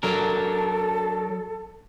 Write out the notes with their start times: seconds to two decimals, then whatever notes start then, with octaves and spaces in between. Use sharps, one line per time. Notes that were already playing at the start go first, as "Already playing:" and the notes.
0.03 F#3 D4 A4 A#4